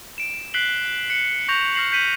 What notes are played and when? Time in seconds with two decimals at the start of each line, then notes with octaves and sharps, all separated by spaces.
0.18 D7 E7
0.54 F#6 B6 C7 D7 F#7 G7
1.10 F#6 C#7
1.48 C#6 G6 A#6 F7
1.75 F6 A#6 C7 F#7
1.92 G6 B6 D#7 F#7